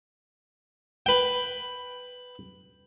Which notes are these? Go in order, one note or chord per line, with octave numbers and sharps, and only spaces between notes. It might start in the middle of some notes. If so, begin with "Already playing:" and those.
B4 G5